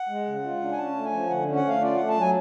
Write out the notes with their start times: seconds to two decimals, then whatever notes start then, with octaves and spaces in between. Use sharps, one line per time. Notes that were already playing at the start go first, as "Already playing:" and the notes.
Already playing: F#5
0.09 G#3
0.26 C#3
0.44 F4
0.61 D4
0.72 G#5
0.78 C#4 A5
0.96 A3
1.05 G#5
1.13 F3
1.30 D3 F#5
1.48 C#4
1.56 F#5
1.65 A3 F5
1.82 F4 D5
1.95 A3 F#5
2.08 A5
2.17 F#3 G#5